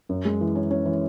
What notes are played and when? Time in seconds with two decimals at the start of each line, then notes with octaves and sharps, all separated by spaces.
0.09 F#2
0.25 G#3
0.41 E3
0.55 C#4
0.71 C#4
0.85 E3